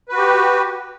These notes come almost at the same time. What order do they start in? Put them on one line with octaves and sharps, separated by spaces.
B4 F#4 G4